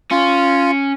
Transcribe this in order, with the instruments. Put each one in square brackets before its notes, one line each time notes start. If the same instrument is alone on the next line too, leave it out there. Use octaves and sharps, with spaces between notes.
[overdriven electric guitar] C#4 [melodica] F4